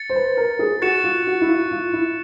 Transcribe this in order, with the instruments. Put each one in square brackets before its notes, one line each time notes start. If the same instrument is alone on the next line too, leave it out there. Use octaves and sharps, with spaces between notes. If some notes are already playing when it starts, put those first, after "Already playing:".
Already playing: [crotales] A6 C#7
[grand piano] C5
B4
A#4
G#4
[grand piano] F#4 [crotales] C#6 F#6 A6 C#7 E7
[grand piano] F4
F#4
E4
F4
F4
E4